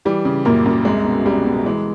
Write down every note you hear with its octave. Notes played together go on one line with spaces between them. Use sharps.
E3 G3
C#3
F#2 A#2 A#3
F#2
C2 G#3
B2
C2 G3
B2
E3 G#3